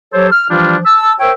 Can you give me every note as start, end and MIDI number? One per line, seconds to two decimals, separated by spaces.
0.14 0.28 54
0.14 0.28 67
0.14 0.28 69
0.14 0.28 72
0.14 0.28 73
0.32 0.47 89
0.51 0.78 52
0.51 0.78 53
0.51 0.78 55
0.51 0.78 62
0.51 0.78 65
0.85 1.13 81
0.85 1.13 88
1.20 1.32 70
1.20 1.32 72
1.20 1.32 73
1.20 1.32 76
1.20 1.32 79